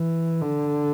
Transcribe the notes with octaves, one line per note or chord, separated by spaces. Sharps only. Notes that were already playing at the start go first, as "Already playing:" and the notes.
Already playing: E3
D3